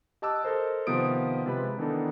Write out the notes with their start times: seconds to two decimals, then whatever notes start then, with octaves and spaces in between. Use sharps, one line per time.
0.22 G4 D#5 A5 D6 E6 F#6
0.43 A4 A#4 C5 D#5
0.87 C3 D#3 F3 B3 D#6 D7
1.46 C3 F3 G#3 B4 B5
1.78 D#3 E3 B3 D4 D#4 A4